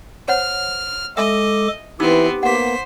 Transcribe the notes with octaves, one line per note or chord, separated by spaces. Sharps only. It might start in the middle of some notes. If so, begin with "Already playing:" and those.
C5 C#5 F#5 F6
G#3 A4 D#5 E5 G#5 D6 E6
E3 B3 C4 D#4 E4 G4 E6
A#3 B3 C5 F#5 D6 B6